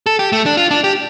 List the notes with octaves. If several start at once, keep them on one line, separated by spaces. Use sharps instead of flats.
A4
G4
A3
D4
F4
D4
G4